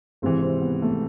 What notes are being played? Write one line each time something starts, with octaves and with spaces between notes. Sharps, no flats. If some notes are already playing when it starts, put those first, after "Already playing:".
G#1 G#2 C3 E3 C4
C3 C4
B3
A3